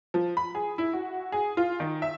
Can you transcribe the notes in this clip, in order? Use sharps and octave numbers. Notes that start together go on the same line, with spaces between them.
F3
B5
G#4
E4
F#4
G#4
F4
D#3
E5